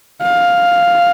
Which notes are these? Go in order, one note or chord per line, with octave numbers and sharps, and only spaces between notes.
F5